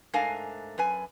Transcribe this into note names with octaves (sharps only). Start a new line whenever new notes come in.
G#2 A3 D4 A#4 F5 G#5
F#2 B4 G#5